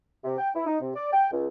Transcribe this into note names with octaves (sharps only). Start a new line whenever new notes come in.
C3
G5
E4
D#4
C3
D5
G5
C#2